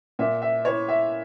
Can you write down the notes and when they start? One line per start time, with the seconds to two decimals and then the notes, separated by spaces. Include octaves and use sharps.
0.19 A#2 E5
0.42 E5
0.65 E4 C#5
0.88 E5